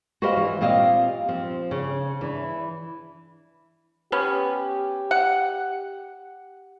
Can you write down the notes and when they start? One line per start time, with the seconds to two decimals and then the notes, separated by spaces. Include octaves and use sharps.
0.22 F#4 G4 B4 C5 D#5 F5
0.37 E3
0.61 A#2 C4 G4 D#5 F5
1.28 F3 C4
1.71 C#3
2.21 E3 D4
4.12 B3 C#4 G4
5.11 F#5